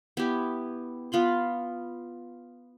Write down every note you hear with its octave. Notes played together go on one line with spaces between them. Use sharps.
B3 E4 G4
B3 F4 B5 C6